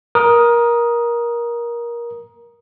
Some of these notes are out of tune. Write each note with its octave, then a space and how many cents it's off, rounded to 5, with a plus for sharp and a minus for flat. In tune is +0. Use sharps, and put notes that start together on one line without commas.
A#4 +20 D#6 +0